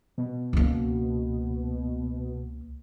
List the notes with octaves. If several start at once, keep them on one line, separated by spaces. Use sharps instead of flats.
B2
C#2 A#3